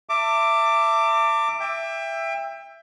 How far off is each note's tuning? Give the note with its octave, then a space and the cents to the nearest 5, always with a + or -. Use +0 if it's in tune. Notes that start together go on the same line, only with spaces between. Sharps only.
E5 +15 A5 +40 D6 +5
E5 +10 G5 +30